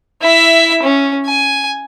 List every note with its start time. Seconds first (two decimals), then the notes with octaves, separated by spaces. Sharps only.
0.22 E4 E5
0.83 C#4
1.26 G#5